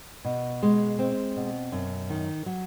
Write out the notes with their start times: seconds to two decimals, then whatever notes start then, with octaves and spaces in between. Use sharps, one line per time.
0.25 B2
0.63 G#3
0.99 C4
1.36 B2
1.72 F#2
2.10 D#3
2.46 F#3